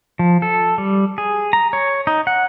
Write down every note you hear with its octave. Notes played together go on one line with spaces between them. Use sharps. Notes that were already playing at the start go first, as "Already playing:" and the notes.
F3
A4
G3
G#4
A#5
C#5
D#4
F#5